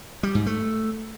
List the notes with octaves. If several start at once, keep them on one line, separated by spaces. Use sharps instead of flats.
G3
G#2
A3